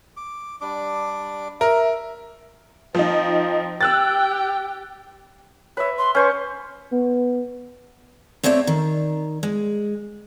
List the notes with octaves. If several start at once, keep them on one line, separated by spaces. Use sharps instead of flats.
D6
G3 D4 D6
A#4 E5
F3 C4 D#4
G4 G5 E6 F#6 A6
B4 C#5 E5
C6
C#4 B4 C5 C#6
B3
A3 C4 C#5 D5 E5
D#3
G#3